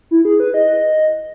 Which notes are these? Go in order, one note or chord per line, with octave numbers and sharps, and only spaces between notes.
E4
G#4
B4
D#5